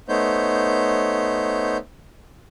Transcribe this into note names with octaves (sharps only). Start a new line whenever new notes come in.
A3 B3 D#4 C5 C#5 G6